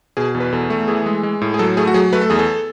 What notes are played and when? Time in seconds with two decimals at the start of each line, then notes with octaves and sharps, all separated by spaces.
0.17 B2 G#4
0.35 E2
0.40 B4
0.52 E2 A4
0.70 A3
0.88 E3 G#4
1.06 G#3
1.23 G#3
1.41 A2
1.54 G#4
1.59 F#3 A4
1.77 A3 G#4
1.87 F#4
1.94 F#3 G#4
2.13 A3 B4
2.21 A4
2.30 E2 G#4
2.39 A4